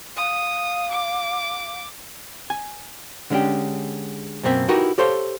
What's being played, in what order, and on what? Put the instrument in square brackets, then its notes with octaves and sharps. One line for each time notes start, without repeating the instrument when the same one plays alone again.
[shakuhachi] F5 [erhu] D#6
[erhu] D6
[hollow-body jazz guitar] G#5
D3 G#3 C#4 D4 G4
F#2 B2 A#3 C4 E5
D#4 E4 F#4 G4 A#4 B4
G4 A4 C5 C#5 F5